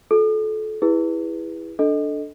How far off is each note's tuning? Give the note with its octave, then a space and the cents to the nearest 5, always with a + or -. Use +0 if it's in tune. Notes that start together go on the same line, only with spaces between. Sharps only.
F4 +35 A4 -25
E4 +0 G#4 -35 B4 -5
D4 +0 A4 +0 D#5 +0